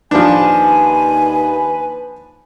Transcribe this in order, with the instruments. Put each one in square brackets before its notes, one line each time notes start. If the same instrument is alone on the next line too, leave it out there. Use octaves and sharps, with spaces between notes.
[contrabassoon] D#2 [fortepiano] F3 D4 [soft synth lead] B4 [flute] G#5